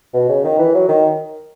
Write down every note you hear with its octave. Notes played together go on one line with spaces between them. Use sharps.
B2
C#3
D#3
E3
F#3
D#3